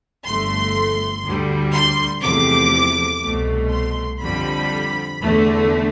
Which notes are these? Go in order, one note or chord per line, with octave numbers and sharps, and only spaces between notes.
G1 G2 F3 A3 C6
D2 D3 G3
C6
E2 C3 F3 A3 D6
C2 B2 A3
C6
F2 D3 G3 B5
E2 D3 A3